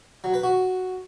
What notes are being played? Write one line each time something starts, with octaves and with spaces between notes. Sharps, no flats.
F#3
B4
F#4